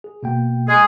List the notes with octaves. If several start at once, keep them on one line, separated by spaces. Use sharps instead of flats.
G#4
B2 A#3 G5
G#3 G#4